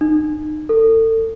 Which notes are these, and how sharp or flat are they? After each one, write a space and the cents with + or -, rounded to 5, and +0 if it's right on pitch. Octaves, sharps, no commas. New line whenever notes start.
D#4 -30
A4 +35